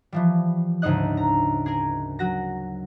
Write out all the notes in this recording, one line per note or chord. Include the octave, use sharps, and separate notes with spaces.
E3 F3 G3
D2 G#2 C#3 D#4 D#5 F#6
A#5
G#4 A#4
F#3 F#4 A#6